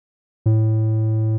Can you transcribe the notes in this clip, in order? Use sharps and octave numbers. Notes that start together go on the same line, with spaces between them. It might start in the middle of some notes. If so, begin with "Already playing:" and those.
A2